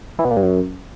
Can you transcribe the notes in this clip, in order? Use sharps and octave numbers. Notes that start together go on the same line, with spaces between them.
E3
B2
A#2
G2
F#2